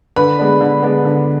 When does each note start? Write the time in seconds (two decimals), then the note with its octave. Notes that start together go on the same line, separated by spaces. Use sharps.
0.16 D3 B4 B5
0.39 G#3 B3 D4
0.61 D3
0.83 G#3 B3 D4
1.05 D3